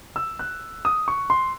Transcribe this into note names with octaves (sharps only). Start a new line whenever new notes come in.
E6
F#6
D#6
C#6
C6